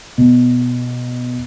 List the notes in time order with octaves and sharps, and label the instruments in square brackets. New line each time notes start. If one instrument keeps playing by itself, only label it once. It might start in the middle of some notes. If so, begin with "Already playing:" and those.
[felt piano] B2